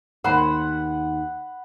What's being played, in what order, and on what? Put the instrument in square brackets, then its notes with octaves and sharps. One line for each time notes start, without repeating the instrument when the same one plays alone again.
[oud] D#2 C5 [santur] F#5 B5